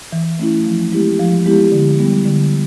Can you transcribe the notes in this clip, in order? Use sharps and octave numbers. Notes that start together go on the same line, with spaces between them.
E3
A3 C#4 E4
F3
G#3 B3 E4 G4
F3
G#3 B3 E4 G4
D3
G3 B3
D3